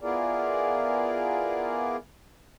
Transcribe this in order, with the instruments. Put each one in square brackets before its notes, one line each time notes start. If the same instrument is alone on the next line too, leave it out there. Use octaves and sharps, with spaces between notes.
[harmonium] B3 E4 F4 G#4 A#4 D5